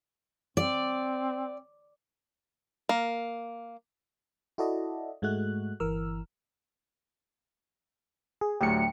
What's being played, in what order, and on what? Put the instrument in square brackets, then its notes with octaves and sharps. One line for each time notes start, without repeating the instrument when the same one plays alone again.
[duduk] C4 [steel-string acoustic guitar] D5
[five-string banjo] A#3
[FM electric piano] E4 F#4 A4 D5 D#5
G#2 G#3 A3 F#4 F#6
G1 E3 A#4 E6 F6
G#4
[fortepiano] D2 A2 F#3 [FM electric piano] G4 C#7